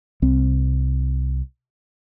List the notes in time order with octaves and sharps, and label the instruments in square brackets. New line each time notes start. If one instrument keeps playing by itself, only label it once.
[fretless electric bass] C2 C4